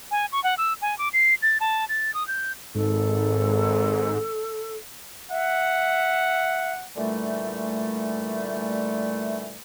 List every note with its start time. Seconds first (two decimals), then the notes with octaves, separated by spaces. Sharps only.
0.11 G#5
0.32 C#6
0.44 F#5
0.58 E6
0.82 G#5
0.98 D6
1.13 C7
1.42 A6
1.60 A5
1.89 A6
2.14 D#6
2.28 G6
2.75 G#1 G#2 A4
5.31 E5 F#5
6.96 A#2 D3 E3 G3 A3